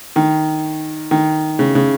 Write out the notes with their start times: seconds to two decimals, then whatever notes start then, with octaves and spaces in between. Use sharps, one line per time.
0.16 D#3
1.11 D#3
1.59 C#3
1.75 C#3